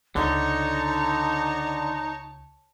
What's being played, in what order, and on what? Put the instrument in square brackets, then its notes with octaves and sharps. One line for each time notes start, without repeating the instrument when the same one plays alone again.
[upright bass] C#2 [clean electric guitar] D3 [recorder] D#4 [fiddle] C#5 A5